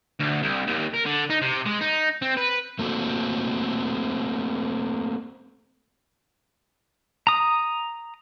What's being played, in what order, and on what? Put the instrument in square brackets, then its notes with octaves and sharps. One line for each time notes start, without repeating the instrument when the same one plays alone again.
[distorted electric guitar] D2
C2
D#2
A#4
D3
D#4
C3
G#3
D#4
C4
B4
[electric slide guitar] A3 A#3 C4 F#4 A4
[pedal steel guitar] A#5 D#6